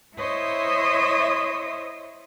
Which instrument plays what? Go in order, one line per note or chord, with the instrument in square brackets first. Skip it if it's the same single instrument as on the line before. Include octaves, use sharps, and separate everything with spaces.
[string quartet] E4 C5 C#5 D#5 E5 D#6